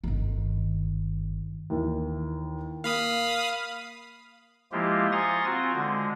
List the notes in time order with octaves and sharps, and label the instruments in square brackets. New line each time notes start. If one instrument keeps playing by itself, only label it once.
[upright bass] G1 D#3
[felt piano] D#2 E3
[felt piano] A#3 [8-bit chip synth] F5 B5 D#6
[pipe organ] F3 G#3 A#3 E4 F4 G4
G#5 A#5 C6 C#6 D#6 A6
C4 F4 F#4
D3 G#3